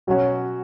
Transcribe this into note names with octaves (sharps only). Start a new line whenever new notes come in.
B2 F#3 C#4 F#4